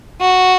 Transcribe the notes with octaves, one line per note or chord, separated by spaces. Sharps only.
F#4